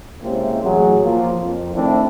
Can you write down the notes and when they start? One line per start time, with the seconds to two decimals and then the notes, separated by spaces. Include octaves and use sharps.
0.22 C3 G#3 A#3 C4 C#4 E4
0.62 A1 F#3 G#4
1.03 F3 A#3 F4
1.41 F2
1.74 D#3 A3 C4 D4 E4